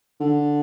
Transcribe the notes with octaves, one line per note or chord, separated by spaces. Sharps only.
D3